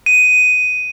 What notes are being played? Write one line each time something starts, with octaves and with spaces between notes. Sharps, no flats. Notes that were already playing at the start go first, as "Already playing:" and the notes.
D#7